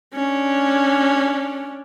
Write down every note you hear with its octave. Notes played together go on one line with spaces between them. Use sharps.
C#4 D4